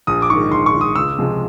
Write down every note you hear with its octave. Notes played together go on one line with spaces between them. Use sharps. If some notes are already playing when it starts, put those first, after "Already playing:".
A#1 D#6
D6
G#2 D#3 C#6
A#1 C6
C#6
G#2 D#3
D#6
C#2 E6
C3 F3 G#3